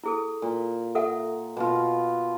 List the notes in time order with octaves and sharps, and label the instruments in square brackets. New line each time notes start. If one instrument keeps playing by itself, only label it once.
[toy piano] E4 G#4 A4
[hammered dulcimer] A#2
[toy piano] A4 E5 F#5
[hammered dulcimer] B2 F4